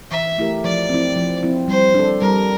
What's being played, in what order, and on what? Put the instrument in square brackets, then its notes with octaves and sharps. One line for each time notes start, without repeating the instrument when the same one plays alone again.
[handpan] E3 [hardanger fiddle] E5
[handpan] A3 E4 G4 A#4
[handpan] F3 [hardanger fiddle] D5
[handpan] C4 E4
F3
C4 E4
[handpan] G3 [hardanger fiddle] C5
[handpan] D4 A4
[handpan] G3 [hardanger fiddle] A#4